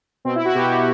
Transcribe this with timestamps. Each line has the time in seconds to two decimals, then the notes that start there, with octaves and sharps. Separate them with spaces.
0.25 B2 C4
0.35 E4
0.45 F#4
0.55 B2 G4